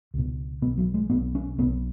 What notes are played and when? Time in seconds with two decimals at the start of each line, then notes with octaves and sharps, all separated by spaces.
0.14 C#2 B2
0.62 B2 B3
0.66 B1
0.78 F#3
0.94 G#3
1.10 B1 B2 B3
1.35 C#4
1.58 B1 B2 B3